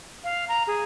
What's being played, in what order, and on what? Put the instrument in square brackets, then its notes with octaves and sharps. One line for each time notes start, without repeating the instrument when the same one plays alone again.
[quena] F5
A#5
G#4